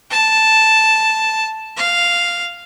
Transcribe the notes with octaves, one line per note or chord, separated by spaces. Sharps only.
A5
F5